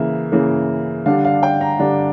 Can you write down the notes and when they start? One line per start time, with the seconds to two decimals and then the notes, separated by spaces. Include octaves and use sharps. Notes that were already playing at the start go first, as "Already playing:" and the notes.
Already playing: C#3 E3 A#3 E5
0.32 C#3 E3 A#3
1.06 D3 G3 D4 F5
1.25 F5
1.43 G5
1.61 A#5
1.79 D3 G3 D4